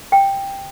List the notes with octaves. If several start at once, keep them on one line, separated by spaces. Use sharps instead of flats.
G5